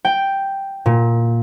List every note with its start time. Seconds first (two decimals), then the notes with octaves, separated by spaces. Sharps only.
0.05 G5
0.86 A#2